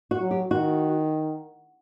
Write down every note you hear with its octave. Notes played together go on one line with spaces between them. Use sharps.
F#4
F#3
G4
D#3 F#4